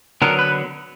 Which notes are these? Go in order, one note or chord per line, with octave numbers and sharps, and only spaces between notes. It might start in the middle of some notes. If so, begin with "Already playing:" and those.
D3 F#3 B3 A#4
B4